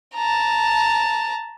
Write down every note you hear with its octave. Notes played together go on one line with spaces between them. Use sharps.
A5 A#5